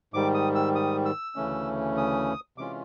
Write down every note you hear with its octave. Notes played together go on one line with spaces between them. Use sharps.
G#2 D#3 G3 D6
D#6
E6
D#6
E6
D2 C#3 E3 A3 C#4
D#6
C3 E3 G#3 C#4 F4 D6